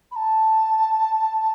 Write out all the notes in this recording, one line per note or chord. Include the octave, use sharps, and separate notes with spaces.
B5
A5